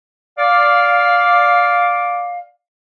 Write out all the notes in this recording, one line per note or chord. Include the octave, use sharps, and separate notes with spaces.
D5 F5